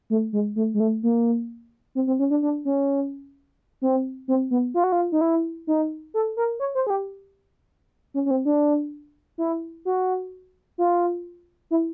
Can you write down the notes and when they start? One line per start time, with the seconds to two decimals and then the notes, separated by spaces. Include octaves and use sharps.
0.10 A3
0.33 G#3
0.56 A3
0.74 G#3
0.80 A3
1.03 A#3
1.95 C4
2.07 C4
2.19 C#4
2.30 D4
2.42 D4
2.65 C#4
3.82 C4
4.28 C4
4.51 B3
4.74 F4
4.84 F#4
4.92 F4
5.12 D#4
5.21 E4
5.67 D#4
6.14 A4
6.37 A#4
6.60 C#5
6.75 C5
6.87 G#4
6.90 G4
8.14 C#4
8.26 C#4
8.31 C4
8.45 D4
9.38 E4
9.85 F#4
10.78 F4
11.71 E4